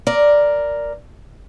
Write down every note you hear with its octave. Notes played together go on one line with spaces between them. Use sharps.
A#4 D5